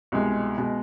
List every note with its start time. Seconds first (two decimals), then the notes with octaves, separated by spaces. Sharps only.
0.12 C2 B2 G#3
0.57 B2 G#3